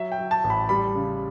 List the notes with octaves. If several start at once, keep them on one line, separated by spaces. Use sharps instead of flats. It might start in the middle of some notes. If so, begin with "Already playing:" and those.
Already playing: F#3 E5
G5
F#3
A5
A1
B5
G3 B5
C#3